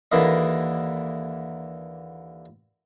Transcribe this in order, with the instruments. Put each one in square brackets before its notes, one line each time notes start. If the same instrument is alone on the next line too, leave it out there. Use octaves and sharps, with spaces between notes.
[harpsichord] D#2 D3 E3 A#3 E4 D#5